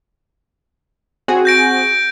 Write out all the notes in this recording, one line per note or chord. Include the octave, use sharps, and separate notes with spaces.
C4 F#4 G#4
G6 A#6 D7